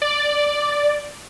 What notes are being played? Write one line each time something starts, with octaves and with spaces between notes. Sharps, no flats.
D5